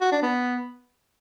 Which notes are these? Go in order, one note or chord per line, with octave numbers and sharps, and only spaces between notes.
F#4
D4
B3